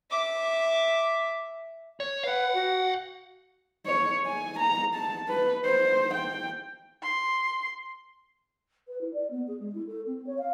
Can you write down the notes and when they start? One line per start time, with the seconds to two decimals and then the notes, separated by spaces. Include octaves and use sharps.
0.10 E5 D6
2.00 C#5
2.23 B4 F5 F#5
2.54 F#4
3.86 C#5
4.26 G#5
4.60 A#5
4.95 A5
5.28 B4
5.65 C5
6.14 G5
7.03 C6
8.88 B4
9.01 E4
9.13 D5
9.30 B3
9.47 G#4
9.59 G#3
9.74 E4
9.86 A4
10.06 C4
10.26 C#5
10.38 F5